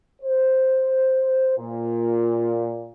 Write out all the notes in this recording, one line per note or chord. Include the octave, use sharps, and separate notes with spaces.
C5
A#2